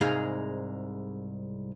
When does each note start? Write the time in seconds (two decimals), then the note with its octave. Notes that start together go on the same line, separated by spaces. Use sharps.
0.01 C2 G#2 G#3 D#4 G#4 F5